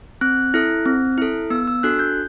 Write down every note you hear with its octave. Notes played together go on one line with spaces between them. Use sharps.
C4 F#6
E4 A4
C4
E4 A4
B3 E6
E6
D4 F#4 A4 F#6
G6